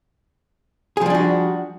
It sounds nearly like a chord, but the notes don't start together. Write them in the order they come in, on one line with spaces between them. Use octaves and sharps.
G#4 F3 G3 D4 F#4